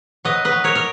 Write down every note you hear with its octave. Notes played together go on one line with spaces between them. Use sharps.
F#3 B4 D#5
B4 D#5
F#3
A#4 C#5
A#4